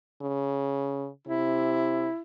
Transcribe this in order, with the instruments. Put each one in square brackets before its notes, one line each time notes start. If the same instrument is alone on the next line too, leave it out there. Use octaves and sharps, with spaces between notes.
[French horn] C#3
[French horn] C3 [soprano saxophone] E4